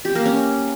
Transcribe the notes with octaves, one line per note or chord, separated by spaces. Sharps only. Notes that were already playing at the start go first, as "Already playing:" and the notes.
G4
A#3
C#4